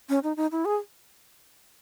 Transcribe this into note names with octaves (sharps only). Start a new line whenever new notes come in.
C#4
D#4
D#4
E4
G#4